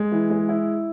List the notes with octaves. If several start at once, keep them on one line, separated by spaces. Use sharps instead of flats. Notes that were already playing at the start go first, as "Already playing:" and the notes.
Already playing: G#3
E3
G#3
E4